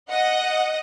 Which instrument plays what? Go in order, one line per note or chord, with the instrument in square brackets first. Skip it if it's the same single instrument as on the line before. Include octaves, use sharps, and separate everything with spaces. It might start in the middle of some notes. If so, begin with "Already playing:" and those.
[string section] D#5 F#5